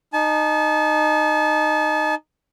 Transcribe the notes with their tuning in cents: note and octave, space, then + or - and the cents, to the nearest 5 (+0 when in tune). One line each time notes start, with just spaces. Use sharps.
D#4 -15 A5 -35